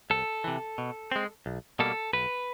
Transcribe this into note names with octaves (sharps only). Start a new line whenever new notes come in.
C2 A4
C3 E3
B2
G#3 C4
B1
B2 G3 A#3 A4
B1 B4